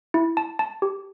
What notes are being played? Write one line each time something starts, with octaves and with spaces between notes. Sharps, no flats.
E4
A5
A5
G4